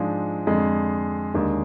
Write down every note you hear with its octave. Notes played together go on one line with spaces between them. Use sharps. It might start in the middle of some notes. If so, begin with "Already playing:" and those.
Already playing: G#2 F3 G#3 D4
F2 D3 G#3
D#2 D3 G#3